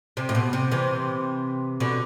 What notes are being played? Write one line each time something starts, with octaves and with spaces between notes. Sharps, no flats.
C3
A2
B2
C3
C3 E3
B2 D3